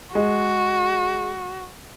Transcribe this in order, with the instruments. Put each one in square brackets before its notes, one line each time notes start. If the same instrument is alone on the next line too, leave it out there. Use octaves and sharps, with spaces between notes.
[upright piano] G#3 [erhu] F#4